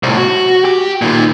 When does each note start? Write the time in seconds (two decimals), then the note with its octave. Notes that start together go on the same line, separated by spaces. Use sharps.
0.03 C2 A2
0.17 F#4
0.65 G4
1.02 A#2 D#3